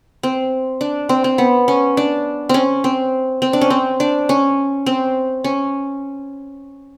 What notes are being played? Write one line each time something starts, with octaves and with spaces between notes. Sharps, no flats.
C4
D4
C4
C4
B3
C#4
D4
C4 C#4
C4
C4
D4
C#4
C4
D4
C#4
C4
C#4